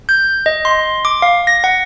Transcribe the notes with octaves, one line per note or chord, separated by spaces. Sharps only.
G6
D#5
C6
D6
F5
A#6
F#5